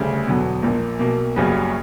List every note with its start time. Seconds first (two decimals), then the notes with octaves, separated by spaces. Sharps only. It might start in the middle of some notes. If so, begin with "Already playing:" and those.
Already playing: D2 C#3 G3
0.26 E1 E2 D3 F#3 B3
0.62 A#1 A#2 A#3
0.99 B1 B2 A#3
1.36 F#1 F#2 C#3 G3 B3